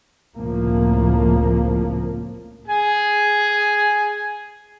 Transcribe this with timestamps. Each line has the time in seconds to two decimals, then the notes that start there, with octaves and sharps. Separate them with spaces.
0.36 F1 C#2 A2 F3 A#3
2.68 G#4 G#5